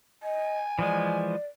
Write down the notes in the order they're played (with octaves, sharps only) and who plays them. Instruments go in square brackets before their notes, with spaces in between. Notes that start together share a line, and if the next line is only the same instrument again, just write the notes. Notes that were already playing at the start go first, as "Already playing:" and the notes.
[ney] D#5 [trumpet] G#5
[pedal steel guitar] E3 F3 G#3 [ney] D5